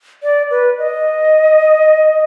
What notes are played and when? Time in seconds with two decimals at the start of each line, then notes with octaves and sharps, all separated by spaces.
0.23 D5
0.51 B4
0.78 D#5